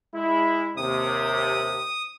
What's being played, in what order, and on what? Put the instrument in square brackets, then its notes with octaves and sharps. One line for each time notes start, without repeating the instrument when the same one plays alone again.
[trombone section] G#3 E4
[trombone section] D#2 C3 [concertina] D#6